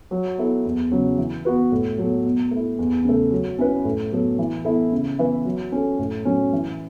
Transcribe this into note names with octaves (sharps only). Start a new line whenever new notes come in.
F#3
B3 E4 A4
E2
C#3 F#3
E3
B3 F#4 B4
A2
F#3 B3 A4
B2
A3 E4
E2
C#3 A3
F#3
C#4 E4 B4
A2
F#3 B3 A4
E3
B3 E4 A4
C#3
E3 B3 E4 B4
F#3
C#4 A4
A2
F#3 C#4
E3